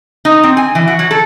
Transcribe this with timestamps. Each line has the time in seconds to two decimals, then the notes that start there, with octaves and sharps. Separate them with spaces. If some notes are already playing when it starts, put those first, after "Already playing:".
0.25 D#4
0.43 C4
0.57 G#5
0.75 E3
0.87 F#4
0.99 F#3
1.11 A4